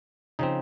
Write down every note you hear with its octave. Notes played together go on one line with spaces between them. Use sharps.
C#3 F3 C4 D#4